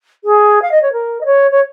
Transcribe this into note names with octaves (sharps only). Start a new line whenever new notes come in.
G#4
F5
D#5
C#5
A#4
D#5
C#5
C#5